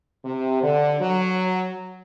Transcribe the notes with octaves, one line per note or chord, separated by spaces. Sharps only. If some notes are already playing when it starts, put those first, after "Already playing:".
C3
D3
F#3